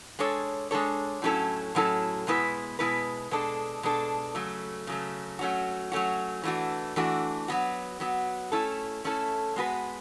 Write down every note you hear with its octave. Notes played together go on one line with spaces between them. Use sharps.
G#3 D4 A4 C#5
G#3 D4 A4 C#5
A2 F#3 C#4 E4 A4
A2 F#3 C#4 E4 A4
B2 G#3 B3 E4 B4
B2 G#3 B3 E4 B4
B2 G#3 D4 A4
B2 G#3 D4 A4
C#3 F#3 A3
C#3 F#3 A3
F#3 A3 C#4 F#4
F#3 A3 C#4 F#4
E3 A3 D4 F#4
E3 A3 D4 F#4
F#3 B3 F#4
F#3 B3 F#4
A3 C#4 E4 A4
A3 C#4 E4 A4
G#3 B3 F#4 B4